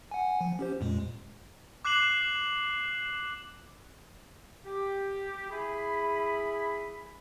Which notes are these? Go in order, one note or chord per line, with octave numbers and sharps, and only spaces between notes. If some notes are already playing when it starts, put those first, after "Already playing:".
F#5 G#5
F3
C#4 G4 C5
F2 A#2 G#3
D6 F#6 C7 E7 F#7
G4
E4 G#4 G#5 B5